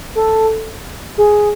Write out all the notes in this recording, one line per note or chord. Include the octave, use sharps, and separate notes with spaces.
A4
G#4